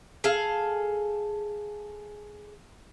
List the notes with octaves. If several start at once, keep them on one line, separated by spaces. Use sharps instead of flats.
G#4 A4 F5